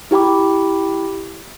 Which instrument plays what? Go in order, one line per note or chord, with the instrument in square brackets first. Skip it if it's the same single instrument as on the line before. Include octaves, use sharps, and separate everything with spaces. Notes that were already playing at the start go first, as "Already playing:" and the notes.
[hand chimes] E4 G4 G5 B5 D6